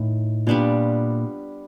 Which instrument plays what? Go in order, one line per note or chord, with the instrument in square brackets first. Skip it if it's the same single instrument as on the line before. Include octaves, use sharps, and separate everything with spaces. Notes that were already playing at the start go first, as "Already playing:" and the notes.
Already playing: [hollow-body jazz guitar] A2 [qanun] D#3
[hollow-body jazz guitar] A#2 [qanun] G3 B3 D4 F4